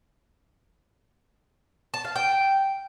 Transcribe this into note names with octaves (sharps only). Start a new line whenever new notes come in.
A5
F5
G5